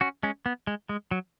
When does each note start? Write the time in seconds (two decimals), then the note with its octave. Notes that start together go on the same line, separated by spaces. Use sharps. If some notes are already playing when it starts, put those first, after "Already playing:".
0.01 C#4 F#4
0.23 G#3 C#4
0.46 B3
0.67 G#3
0.89 G#3
1.11 F#3